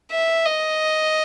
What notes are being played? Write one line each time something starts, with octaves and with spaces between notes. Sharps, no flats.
E5
D#5